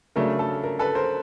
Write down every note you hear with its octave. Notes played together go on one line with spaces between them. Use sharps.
C#3 F#3 A3 D4 A#4
A4
A#4
A4 B4
A#4 C5